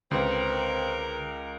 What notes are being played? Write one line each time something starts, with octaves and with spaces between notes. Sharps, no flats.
C#2 D3 C4 A#4 B4